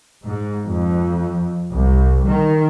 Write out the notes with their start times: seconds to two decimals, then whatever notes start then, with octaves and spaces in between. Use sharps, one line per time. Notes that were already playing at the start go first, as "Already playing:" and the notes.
0.25 G#2
0.67 F2
1.73 C2
2.27 D#3